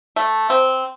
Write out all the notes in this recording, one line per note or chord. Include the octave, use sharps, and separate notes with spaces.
A3
C4